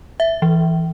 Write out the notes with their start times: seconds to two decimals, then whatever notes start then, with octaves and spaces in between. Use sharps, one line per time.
0.20 E5
0.42 E3